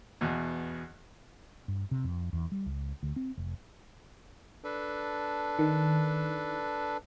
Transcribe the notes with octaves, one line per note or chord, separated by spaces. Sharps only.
E2 B2
G2
C3
F2
E2
G3
C#2
D2
C4
F1
D4 A4 B4
D#3